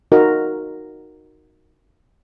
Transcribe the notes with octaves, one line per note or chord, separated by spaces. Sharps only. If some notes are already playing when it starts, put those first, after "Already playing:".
D#4 F#4 A#4